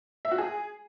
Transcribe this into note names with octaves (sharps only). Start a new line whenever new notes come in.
E5
F#4
G#4